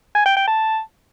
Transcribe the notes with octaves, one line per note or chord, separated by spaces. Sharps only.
G#5
G5
G5
A5